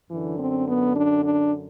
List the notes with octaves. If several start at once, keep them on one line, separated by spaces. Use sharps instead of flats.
F#2 D3 E3
C4
B3
D4
D4